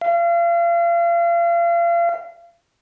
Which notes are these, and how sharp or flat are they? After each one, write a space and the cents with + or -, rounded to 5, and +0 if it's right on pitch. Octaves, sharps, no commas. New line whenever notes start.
F5 -35